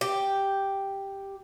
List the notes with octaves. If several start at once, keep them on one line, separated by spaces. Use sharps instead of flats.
G4